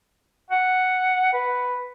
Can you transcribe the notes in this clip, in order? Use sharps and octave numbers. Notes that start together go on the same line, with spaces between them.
F#5
B4